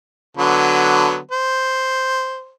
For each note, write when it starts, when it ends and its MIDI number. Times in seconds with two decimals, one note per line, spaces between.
0.37 1.17 50
0.37 1.17 54
0.37 1.17 59
1.31 2.51 72